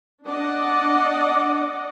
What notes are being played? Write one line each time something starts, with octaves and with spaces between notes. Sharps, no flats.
D4 D5 D#5 F#5